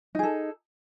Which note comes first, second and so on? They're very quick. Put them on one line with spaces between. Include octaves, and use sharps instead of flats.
D#4 G#4 A4